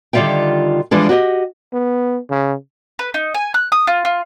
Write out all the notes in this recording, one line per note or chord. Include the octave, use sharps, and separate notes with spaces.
D3 D#3 G3 F4 E5 G5
E3 F3 G3 G#3 D4
F#4 G4 C#5 D#5
B3
C#3
B4
D#4
G#5
F#6
D#6
F4
F4